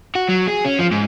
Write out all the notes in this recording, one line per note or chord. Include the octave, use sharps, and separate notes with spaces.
F#4
F#3
G#4
C#4
F3
G#2